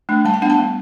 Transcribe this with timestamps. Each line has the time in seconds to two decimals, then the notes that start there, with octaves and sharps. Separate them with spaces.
0.09 A3 D4
0.25 G3 A5
0.34 G5
0.42 B3 D4 F#5
0.50 A5
0.58 G3